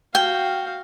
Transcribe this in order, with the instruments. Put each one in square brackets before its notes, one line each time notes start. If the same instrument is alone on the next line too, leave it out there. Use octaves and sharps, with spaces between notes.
[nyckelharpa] F#4 F5 [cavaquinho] G5